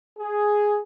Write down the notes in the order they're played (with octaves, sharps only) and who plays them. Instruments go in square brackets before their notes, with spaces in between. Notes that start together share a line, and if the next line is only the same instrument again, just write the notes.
[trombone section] G#4